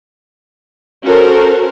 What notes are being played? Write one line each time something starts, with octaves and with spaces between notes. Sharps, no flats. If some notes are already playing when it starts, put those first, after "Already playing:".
C#4 F#4 A4 A#4 C5